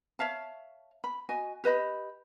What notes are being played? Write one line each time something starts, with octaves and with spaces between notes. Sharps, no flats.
C#5 E5 F5 A5
B5
F#4 D#5 G#5
G4 B4 D#5 B5